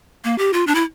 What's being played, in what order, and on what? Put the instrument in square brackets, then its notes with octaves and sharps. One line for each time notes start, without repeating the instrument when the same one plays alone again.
[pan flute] A#3
G4
F4
D4
E4